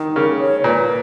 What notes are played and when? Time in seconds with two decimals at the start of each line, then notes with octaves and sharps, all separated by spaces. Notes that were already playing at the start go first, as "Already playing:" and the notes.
Already playing: D#3
0.15 C#3 A#4
0.39 C#5
0.64 A#2 B4